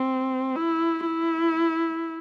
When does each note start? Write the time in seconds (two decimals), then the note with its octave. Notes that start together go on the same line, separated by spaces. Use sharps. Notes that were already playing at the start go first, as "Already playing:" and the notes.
Already playing: C4
0.56 E4
1.06 E4